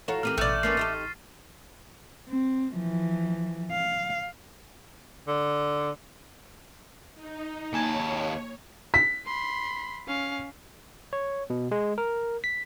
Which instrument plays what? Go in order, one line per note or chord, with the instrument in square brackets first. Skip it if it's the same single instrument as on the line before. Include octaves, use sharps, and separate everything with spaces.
[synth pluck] E3 A4 A#5 [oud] F4 F#4 C#5 [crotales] E7
[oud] A#3 C4 G4 [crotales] F6 D#7
[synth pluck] A1 [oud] B2 D3 [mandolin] A3 D5
[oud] A#3 C#4 B4 [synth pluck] C6 C#6 [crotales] A6 B6 C7
[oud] D#4 G4 A4
[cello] C4
E3 F3
F5
[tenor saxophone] D3
[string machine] D#4
[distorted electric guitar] D#2 A5 [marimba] A#3 G#5 G#6 [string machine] C#5
[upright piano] B6
[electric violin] B5 C6
C#4 F5
[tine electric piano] C#5
B2
G#3
A#4
B6